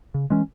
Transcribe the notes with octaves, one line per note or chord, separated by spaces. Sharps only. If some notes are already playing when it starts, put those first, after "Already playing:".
C#3
E3 G#3 C#4